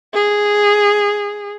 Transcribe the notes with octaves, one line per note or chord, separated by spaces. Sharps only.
G#4